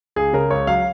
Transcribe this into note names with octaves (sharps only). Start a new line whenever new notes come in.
C#2 G#4
C#3 A#4
C#2 C#5
F#3 F5